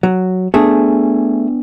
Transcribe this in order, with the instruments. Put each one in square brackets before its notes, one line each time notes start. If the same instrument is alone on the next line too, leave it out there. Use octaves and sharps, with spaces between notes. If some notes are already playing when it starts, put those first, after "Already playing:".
[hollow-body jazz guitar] F#3
[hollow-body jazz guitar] A3 G#4 [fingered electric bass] B3 D4